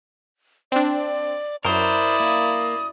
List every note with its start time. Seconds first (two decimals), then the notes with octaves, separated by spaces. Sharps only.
0.72 C4 D4 D5
1.65 F#2 E4 A#4 C5 D5 D#6
2.20 A#3